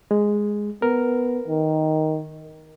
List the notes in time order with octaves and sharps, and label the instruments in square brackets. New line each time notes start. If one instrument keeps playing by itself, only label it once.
[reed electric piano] G#3
[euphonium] B3 [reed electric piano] A#4
[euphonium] D#3